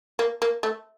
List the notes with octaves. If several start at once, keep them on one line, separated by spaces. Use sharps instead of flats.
A#3
A#3
A3